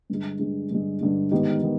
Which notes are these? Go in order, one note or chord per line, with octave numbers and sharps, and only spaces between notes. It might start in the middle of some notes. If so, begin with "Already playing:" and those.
G2 D3 G#3
G2 D3 G#3
G2 D3 G#3
G2 D3 G#3
G#2 D#3 B3 D#4 G4
D#3 B3